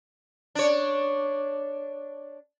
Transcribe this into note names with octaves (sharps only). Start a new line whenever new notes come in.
D4 C#5